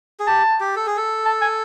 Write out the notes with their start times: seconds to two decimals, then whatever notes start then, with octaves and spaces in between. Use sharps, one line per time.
0.20 G#4
0.27 G4 A5
0.60 G4
0.76 A4
0.87 G#4
0.97 A4
1.26 A5
1.42 G#5